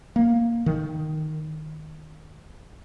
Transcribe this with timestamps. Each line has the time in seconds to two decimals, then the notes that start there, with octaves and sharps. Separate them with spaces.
0.16 A#3
0.66 D#3